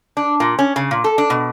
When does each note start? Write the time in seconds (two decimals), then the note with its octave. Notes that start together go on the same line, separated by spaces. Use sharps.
0.17 D4
0.40 A#2
0.59 C#4
0.76 C#3
0.91 A#2
1.04 A4
1.18 D4
1.30 B2